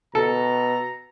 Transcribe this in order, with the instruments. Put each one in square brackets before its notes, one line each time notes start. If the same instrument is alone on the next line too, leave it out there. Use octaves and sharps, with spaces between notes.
[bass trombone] B2 [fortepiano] A4 [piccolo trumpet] A#5